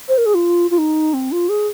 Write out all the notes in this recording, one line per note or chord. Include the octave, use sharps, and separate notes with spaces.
C5
A#4
G#4
F4
F4
D#4
C4
F4
G#4